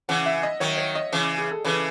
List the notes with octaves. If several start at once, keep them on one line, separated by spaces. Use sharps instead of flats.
C#3 E3 F#5
E5
D#5
D#3 F#3 C#5
C#5
D#5
C#3 E3
G#4
A4
C#3 E3 B4